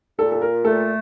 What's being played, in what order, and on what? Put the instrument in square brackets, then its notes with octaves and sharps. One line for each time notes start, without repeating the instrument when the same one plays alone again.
[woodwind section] A#2 [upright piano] A4
[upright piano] A4
A#4
[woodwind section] A3 [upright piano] A4